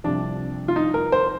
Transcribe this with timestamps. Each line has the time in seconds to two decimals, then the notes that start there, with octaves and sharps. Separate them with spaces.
0.04 C2 C3 F3 D4
0.68 F4
0.76 D#4
0.94 A#4
1.12 C5